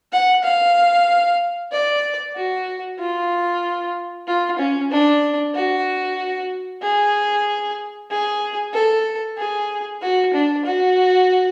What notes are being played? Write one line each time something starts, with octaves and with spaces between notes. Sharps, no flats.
F#5
F5
D5
F#4
F4
F4
C#4
D4
F#4
G#4
G#4
A4
G#4
F#4
D4
F#4